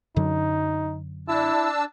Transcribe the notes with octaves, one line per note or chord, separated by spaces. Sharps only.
F#2 D3 F#3 D#4
D4 E4 A5 E6